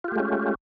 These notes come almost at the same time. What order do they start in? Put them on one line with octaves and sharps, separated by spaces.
F4 G4 A3 G#3 C#4